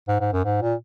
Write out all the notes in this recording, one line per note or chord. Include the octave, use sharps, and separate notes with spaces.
G#2
G#2
F#2
G#2
A#2